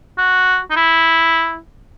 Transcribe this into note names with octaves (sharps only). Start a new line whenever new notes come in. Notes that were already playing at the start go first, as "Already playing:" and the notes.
F#4
D#4
E4